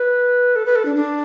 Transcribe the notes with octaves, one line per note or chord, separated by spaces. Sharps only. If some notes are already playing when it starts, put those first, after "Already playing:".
Already playing: B4
A4
B4
A4
D4
D4